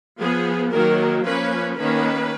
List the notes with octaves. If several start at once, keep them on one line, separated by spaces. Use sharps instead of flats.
F3 B3 G#4
D#3 F#3 A#3 A#4
F3 A#3 C#4 B4
D#3 A#3 C#4 B4